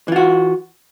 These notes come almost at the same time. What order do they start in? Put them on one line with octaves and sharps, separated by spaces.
E3 F4 F#4